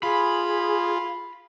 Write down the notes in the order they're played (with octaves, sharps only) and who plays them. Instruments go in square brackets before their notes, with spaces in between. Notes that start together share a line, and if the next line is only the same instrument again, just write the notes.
[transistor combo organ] F4 [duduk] G#4 [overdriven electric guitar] B5